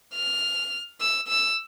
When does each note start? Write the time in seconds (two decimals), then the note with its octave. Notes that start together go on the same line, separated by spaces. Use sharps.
0.15 F6
1.01 E6
1.28 E6